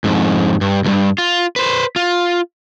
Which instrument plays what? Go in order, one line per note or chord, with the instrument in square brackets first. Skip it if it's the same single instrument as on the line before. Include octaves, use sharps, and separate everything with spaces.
[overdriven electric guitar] F2 G#2
G2
C#2 G2
F4
B4 C5
F4